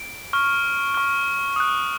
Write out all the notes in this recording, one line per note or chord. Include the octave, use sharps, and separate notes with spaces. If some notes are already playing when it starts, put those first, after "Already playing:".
Already playing: D7
C#6 F6
C#6 F6
D#6 F#6